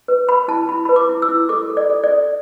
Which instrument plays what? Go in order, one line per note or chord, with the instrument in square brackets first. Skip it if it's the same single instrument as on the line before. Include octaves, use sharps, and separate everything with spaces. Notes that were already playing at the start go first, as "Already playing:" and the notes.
[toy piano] B4
B4 B5
E4 A5
E4 B5
B4 B5
D6
E4
E6
E4
A4 D6
A4
D5
A4
D5
A4